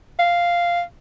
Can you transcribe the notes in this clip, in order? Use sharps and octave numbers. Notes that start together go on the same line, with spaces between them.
F5